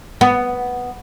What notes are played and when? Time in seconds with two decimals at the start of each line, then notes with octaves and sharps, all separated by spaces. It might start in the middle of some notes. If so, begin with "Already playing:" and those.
0.21 B3